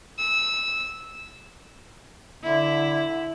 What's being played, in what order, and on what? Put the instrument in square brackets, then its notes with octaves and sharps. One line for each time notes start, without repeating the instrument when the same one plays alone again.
[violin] E6
[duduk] D3 [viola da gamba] E4